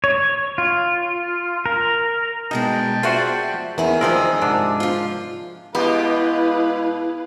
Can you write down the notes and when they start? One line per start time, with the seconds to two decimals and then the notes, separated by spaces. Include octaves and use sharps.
0.04 C#5
0.58 F4
1.66 A#4
2.51 G2 B2 G#3 D#4 G5 A5
3.03 F4 F#4 G#4 C5 D5 E5
3.78 E2 D#3 C#4 E4 G#4 A#4 E5
4.01 D2 F3 C4 A#4 D5 D#5 E6
4.42 G#2 C3 D4
4.80 F3 F4
5.75 B2 G#3 B3 E4 G4 B4 F5